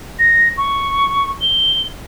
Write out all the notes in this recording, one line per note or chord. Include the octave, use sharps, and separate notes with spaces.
A#6
C#6
G7